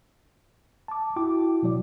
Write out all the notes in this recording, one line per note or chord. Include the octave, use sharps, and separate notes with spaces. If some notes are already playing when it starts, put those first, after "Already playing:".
A5 D6
E4 F#4 G5 D6
B2 F#3 D5